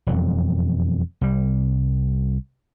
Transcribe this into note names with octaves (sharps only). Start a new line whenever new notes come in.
E1 F2 F#3
C2 G3